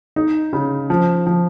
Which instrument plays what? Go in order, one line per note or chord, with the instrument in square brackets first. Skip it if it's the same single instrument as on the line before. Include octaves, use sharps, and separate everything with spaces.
[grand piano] D#4
C#3
F3
F3